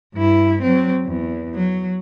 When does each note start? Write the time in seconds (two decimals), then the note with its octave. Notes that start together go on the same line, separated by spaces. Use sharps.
0.14 G2 E4
0.62 F#3 C4
1.06 E2
1.54 F#3